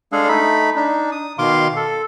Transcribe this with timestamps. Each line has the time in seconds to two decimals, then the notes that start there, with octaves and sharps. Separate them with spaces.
0.12 G#3 D4 G#4 A4 F5
0.28 A3 D#4 B5
0.76 D4 D#4
1.12 D#6
1.38 B2 D#3 F5 C6 D6
1.76 A4